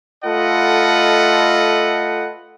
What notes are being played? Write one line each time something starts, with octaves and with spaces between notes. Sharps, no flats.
A3 F4 A4 B4 D#5 F#5